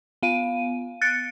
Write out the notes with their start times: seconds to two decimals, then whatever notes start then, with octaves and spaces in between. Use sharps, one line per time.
0.23 B3 F5 D#7
1.01 F#6 A6 C#7 D7